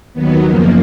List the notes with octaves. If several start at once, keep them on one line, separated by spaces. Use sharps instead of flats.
D#2 D#3 F#3 B3
F#2 C#3 F3 A#3